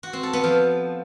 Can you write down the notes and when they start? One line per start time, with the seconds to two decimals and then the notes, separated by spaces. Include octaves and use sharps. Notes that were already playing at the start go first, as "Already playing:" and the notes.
0.03 F#4
0.13 C4
0.23 A4
0.33 B3
0.43 F3